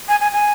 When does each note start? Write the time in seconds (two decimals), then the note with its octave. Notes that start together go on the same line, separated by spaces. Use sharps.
0.08 G#5
0.20 G#5
0.32 G#5